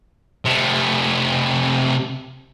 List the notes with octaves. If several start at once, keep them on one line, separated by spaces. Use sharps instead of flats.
C3 A3